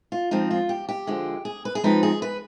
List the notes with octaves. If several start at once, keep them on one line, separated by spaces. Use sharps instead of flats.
F4
F3 G#3 C4 D#4
F4
G4
G4
D3 F3 G#3
G#4
B4
G#4
F3 G#3 C4 D#4 B4
G#4
B4